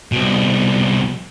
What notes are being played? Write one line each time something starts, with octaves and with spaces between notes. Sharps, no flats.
C2 B2